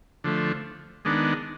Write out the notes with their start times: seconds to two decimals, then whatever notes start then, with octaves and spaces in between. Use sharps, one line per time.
0.24 D3 F3 A3
1.05 D#3 G#3 B3 D4